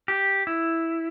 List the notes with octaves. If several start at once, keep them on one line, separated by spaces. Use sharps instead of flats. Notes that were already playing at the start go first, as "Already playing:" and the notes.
G4
E4